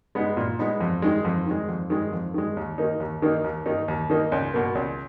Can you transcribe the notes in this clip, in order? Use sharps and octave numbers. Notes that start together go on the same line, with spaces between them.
G#3 B3 D#4
A#2
G#3 B3 D#4
F2
D#3 G#3
F2
D#3 G#3
F2
D#3 G#3
F2
D#3 G#3
D#2
D#3 A#3 D#4
D#2
D#3 A#3 D#4
D#2
D#3 A#3 D#4
D#2
D#3 A#3 D#4
C#2
B2 A#3
C#2